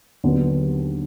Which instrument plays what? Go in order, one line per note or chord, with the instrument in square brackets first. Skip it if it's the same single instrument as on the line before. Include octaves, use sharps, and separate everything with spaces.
[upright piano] D#2 D3 F#3 B3